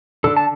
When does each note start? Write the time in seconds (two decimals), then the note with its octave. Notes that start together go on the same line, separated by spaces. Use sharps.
0.24 D3 A4
0.37 A5